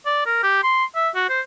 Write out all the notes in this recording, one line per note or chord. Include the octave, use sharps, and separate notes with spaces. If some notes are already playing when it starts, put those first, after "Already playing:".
D5
A#4
G4
C6
E5
F#4
C5